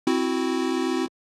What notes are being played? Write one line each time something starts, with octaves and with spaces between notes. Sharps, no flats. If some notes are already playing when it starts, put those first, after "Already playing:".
C4 E4 F#4